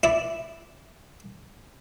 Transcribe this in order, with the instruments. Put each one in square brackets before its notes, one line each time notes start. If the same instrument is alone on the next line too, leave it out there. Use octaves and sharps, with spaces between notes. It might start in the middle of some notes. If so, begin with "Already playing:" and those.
[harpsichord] E4 D5